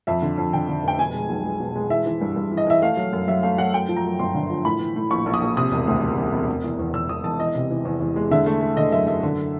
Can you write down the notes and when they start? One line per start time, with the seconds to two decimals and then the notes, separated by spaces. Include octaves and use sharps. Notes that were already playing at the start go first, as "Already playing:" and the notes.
0.07 F2 E5
0.22 D3
0.38 F2
0.53 D3 G5
0.69 D3
0.83 F1 G5
0.98 B2 G#5
1.14 G#3
1.29 B1
1.44 G#3
1.60 B2
1.76 G#3
1.90 E3 E5
2.06 E3
2.21 G2
2.36 G2
2.51 E3
2.57 D#5
2.67 E3 E5
2.82 A3 F5
2.97 F#3
3.13 F#2
3.28 F#3 E5
3.43 A3 F5
3.58 F#3 F#5
3.74 F#2 G5
3.88 F3
3.96 A#5
4.04 F#2
4.19 G1 C6
4.35 D3
4.50 F3
4.65 A2 B5
4.80 E3
4.96 A2
5.11 A#1 C#6
5.26 A#1
5.34 D#6
5.41 A#1
5.57 C3 D#6
5.72 E1
5.87 D2
6.02 E1
6.18 E1
6.33 E1
6.48 E1
6.64 E2
6.79 E2
6.94 E2 E6
7.09 E1 D#6
7.24 E1 A5
7.40 E3 D#5
7.55 C3
7.70 E3
7.85 E2
8.01 E2
8.16 G#3
8.31 D3 E5
8.46 A3
8.61 A3
8.77 D3 D#5
8.92 F#2 E5
9.07 F#2 E5
9.23 D3